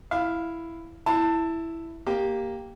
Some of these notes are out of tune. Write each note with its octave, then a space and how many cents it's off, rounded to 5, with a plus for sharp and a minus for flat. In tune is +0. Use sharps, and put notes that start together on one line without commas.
E4 +5 F5 +0
E4 +0 A5 +20
A#3 +0 G4 +5